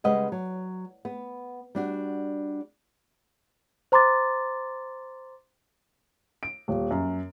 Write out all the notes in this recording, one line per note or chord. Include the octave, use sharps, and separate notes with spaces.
C#3 G3 G#3 B4 D#5 F#5
F#3
B3
G3 D4 F#4
C5 A#5 C6 D6 A6
D7
D#1
F#2